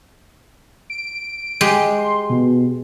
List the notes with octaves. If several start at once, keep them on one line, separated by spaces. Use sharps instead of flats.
D7
G#3 G4
C6
B2